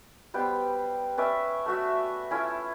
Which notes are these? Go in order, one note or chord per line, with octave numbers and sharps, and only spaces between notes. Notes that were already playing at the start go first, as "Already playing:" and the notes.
G3 B3 C5 G5
C#4 B4 D5 E5
A3 F#4 E5
C#4 E4 F4 A4